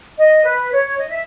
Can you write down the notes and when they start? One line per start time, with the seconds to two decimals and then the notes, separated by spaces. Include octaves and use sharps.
0.18 D#5
0.44 B4
0.72 C#5
0.99 D#5
1.09 E5